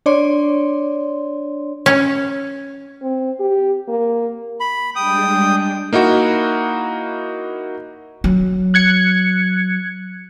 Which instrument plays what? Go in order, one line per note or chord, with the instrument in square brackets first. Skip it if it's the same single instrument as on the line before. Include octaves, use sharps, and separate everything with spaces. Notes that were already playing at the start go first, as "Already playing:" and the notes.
[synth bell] D4 C#5 D5 C6
[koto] C#4
[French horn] C4
G4
A#3
[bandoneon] B5
[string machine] G3 G#3 D4 [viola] G5 [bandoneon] D#6
[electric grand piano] A#3 D#4 E4 F#4
[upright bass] F#3
[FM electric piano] F#6 G#6 C#7